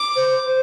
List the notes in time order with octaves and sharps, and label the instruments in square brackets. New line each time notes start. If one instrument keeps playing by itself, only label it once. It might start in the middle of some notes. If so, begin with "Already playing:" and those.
Already playing: [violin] D6
[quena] C5
C5